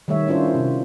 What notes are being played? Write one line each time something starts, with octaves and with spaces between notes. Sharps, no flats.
D#3 G3 A3 C#5 E5
C#4 D4 E4 F4 C5
C3